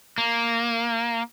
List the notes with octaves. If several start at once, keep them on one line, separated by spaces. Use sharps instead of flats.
A#3